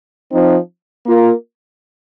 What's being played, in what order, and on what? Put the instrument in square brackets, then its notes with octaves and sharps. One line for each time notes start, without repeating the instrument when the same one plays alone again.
[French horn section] F3 C4 D#4
A#3 F4 A#4